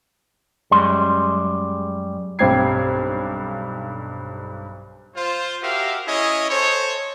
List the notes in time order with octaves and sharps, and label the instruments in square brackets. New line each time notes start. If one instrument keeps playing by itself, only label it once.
[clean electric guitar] F#2 G3 G#3 C6
[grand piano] B1 G2 C4 G4 G#6 C7
[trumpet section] F4 C5
F#4 G4 A#4 E5 F5
C#4 E4 G#4 C#5 D#5
A4 C5 C#5